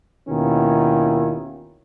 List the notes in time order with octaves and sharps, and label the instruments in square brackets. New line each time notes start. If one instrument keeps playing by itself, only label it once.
[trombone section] D#2 B2 D#3 C#4 E4 F4